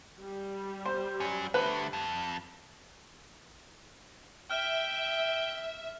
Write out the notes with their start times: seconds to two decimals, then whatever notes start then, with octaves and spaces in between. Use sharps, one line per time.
0.19 G3
0.86 C5
1.20 F#3 C#4
1.54 D3 A3 B4
1.93 F2
4.51 E5 G5 F6